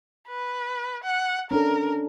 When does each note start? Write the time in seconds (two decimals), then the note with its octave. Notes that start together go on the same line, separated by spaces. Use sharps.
0.28 B4
1.04 F#5
1.51 C#4 D4 A4 A#4